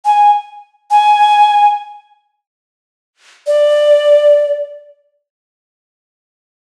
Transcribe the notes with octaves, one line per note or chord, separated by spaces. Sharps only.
G#5
G#5
D5